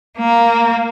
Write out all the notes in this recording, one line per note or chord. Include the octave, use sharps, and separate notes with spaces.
A#3